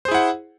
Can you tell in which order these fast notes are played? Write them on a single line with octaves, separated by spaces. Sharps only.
C5 G#4 E4 F#5